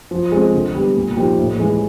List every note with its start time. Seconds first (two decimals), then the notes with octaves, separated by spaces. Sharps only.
0.11 F3
0.32 G#3 C4
0.53 D3
0.75 G3 B3
0.95 A#2
1.16 F3 A#3 D#4 G4
1.38 A2
1.59 E3 G#3